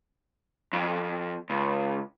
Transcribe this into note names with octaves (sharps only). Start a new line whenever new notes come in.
F2
C#2